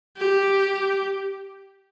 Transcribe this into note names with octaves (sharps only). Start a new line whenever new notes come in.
G4